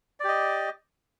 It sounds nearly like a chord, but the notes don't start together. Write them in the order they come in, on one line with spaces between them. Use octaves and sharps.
D5 G4 D#5